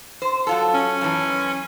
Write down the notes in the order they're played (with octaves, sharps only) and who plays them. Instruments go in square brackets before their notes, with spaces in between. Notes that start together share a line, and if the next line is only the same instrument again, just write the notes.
[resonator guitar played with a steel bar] C5
F#3 F4 A4
[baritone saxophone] C#4
[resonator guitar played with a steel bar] F#2 E3